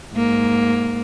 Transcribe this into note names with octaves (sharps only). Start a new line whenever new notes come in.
G#2 A#3